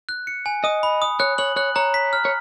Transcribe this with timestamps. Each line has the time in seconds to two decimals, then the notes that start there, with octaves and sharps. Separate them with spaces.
0.09 F#6
0.27 C#7
0.46 G#5
0.64 D#5 D#6
0.83 B5
1.02 D#6
1.20 C#5 F#6
1.38 C#5 F#7
1.56 C#5 F#6
1.76 C#5 A#5
1.94 B6
2.13 F6
2.25 C#5